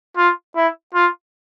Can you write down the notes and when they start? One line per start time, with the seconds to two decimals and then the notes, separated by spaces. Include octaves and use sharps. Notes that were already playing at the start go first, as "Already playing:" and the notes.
0.17 F4
0.56 E4
0.94 F4